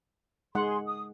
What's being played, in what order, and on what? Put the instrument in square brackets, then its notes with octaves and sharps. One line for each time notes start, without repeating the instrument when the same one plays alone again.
[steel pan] G#3 D#4 F#5 [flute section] G#4 C6
[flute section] D#6